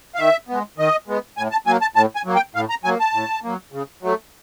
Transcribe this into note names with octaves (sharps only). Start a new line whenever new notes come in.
F5
D#3 E5
G#3 B3
D#3 D#5
G#3 B3
A2 G#5
A5
F#3 A#3 G#5
A5
A2 A5
G#5
F#3 A#3
G5
A2 F5
A#5
F#3 A#3 G#5
A5
A2
F#3 A#3
C#3
F#3 A3